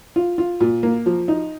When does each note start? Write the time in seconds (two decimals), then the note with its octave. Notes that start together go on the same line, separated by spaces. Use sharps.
0.16 F4
0.38 F4
0.61 A#2
0.83 A#3
1.06 F3
1.28 D#4